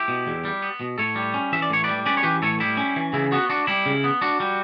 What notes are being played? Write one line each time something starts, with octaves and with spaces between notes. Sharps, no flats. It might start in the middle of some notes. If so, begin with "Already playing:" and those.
Already playing: E4 G4
B2
E2
G3
B3
B2
A2 A4 C#5
G3
C#4
E3 E5
D5
A2 C#5
G3 B4 D5
C#4 B4 D5
C#5
E3 G4 B4
A2 A4 C#5
G3 E4
C#4
E3
C#3 E4
B3 F#4
D4 F#4
G3 E4
C#3
B3
D4 F#4
G3